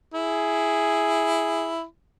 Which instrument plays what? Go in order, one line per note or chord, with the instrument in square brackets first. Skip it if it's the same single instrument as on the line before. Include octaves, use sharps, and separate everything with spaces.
[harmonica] E4 [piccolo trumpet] G#4